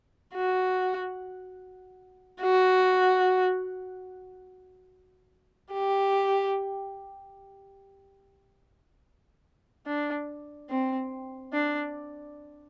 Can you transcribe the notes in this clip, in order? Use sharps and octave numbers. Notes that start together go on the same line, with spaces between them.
F#4
F#4
G4
D4
C4
D4